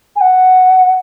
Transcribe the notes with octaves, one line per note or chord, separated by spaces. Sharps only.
G#5
F#5